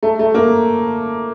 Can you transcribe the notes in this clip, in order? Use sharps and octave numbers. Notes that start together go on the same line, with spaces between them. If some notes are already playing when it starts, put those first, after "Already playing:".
A3
A3
A#3